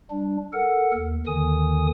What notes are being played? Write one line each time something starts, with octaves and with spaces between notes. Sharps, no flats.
G3 D4
A4 A#4 F#5
D#2
D#2 D3 D#3 G#5 D#6